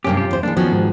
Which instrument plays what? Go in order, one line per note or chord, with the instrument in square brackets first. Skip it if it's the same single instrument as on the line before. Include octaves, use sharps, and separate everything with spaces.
[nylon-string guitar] G2 C3 C#4 [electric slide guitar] A#3 G4
[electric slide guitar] F4 G4
[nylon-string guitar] E2 C5
[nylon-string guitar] E3 G#3 A#3 [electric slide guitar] D4
[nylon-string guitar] D#3 F3 F#4 [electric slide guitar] B3 C#4
[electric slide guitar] G#2